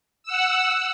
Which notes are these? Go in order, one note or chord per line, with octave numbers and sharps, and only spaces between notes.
F#5 E6